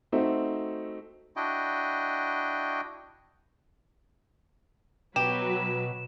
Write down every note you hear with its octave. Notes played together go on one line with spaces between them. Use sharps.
A3 C4 D#4 F#4 C5 E5
D4 E4 F#4 D#5 G5
B2 F#3 G4 B4 E7